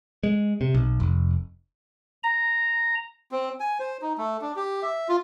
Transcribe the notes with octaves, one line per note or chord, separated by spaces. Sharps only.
G#3
C3
B1
F1
A#5
C4
G#5
C5
D#4
A3
D4
G4
E5
F4